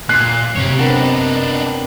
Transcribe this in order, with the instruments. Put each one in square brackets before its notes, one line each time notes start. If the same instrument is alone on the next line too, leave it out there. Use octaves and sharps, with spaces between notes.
[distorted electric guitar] A#2 [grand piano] F#6 C7
[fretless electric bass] F#2 C3 [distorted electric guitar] G4 C#5
[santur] B3 C4 A#4 [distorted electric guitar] D4 D#4